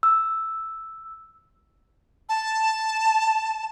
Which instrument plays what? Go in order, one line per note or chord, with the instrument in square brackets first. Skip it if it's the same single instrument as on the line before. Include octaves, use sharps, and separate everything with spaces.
[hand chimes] E6
[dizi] A5